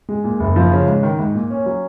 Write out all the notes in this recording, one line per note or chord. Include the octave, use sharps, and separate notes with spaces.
G#3
A#2
F#1
F3
C#3
G#2
D#3
G#2
A#2
C#4
F#3